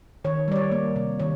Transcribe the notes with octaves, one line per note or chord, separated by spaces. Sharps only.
D#3 C#5
G3 D5
C#5
A#3
C3
D#3 C#5